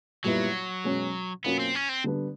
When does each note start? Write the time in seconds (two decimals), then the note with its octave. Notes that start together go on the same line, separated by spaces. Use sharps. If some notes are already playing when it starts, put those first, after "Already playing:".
0.24 A#2 F#3 G3 B3 E4
0.84 B2 G#3 C#4
1.44 B2 F#3 A#3 B3 C#4 F4
1.59 C4
1.75 C#4
1.89 C4
2.04 D3 G3 B3 D4